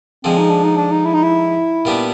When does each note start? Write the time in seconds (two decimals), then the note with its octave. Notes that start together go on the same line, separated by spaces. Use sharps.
0.24 D3 F3 G#3 C4
0.38 D#4
0.50 D4
0.64 D#4
0.77 D4
0.91 D#4
1.05 E4
1.14 D#4
1.23 E4
1.85 A#2 G3 B3 D4